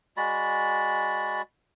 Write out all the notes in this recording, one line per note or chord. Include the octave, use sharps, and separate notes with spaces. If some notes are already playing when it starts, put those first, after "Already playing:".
G#3 F#4 D5 B5